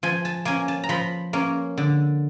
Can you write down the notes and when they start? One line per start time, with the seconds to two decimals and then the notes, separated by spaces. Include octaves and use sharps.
0.03 F3 G#5
0.25 A5
0.45 A#3 C#4 G#5
0.68 A5
0.84 A#5
0.89 F3 B5
1.33 A#3 C#4
1.77 D3